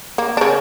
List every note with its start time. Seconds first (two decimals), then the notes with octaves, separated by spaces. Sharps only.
0.18 A#3
0.37 D4
0.41 C#3 C#4